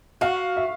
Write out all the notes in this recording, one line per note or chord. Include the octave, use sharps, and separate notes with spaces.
F#4 F5
E5